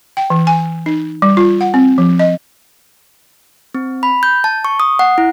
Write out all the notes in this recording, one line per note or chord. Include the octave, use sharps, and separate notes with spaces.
G5
E3
G#5
D#4
G3
F4
F#5
C4
F3
D#5
C4
B5
G6
A5
C#6
D#6
F#5
E4